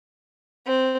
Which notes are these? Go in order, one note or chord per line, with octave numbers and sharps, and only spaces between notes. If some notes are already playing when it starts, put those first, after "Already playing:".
C4